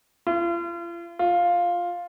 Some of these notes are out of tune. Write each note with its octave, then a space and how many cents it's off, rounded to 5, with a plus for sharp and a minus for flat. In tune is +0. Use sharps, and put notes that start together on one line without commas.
F4 -40
F4 +5